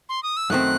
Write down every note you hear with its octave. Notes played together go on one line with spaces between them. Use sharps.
C6
D#6
E6
F#2 D#3 A3 C4 F#6